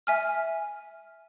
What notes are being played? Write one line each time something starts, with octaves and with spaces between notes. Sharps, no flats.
E5 G#5 F6